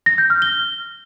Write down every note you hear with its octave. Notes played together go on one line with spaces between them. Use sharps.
A#6
G6
F6
G7